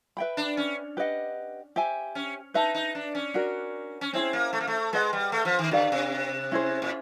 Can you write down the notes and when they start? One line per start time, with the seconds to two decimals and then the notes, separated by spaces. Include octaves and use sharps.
0.17 B4 E5 G5 B5
0.37 D4
0.57 C#4
0.97 G4 B4 D#5 F#5
1.76 G4 C5 E5 G#5
2.15 C#4
2.54 D#4 B4 E5 A5
2.75 D#4
2.95 D4
3.15 C#4
3.34 D4 F#4 A#4
4.01 C#4
4.13 C4 C#4 E4 G#4 C5
4.33 A#3
4.53 A3
4.61 A#3
4.67 A3
4.93 G#3 B4 D#5 F#5
5.13 G3
5.32 A3
5.45 F3
5.59 D#3
5.71 D3 G4 B4 D5 F5
5.92 C3
6.52 C#4 E4 G#4 C5
6.82 A#2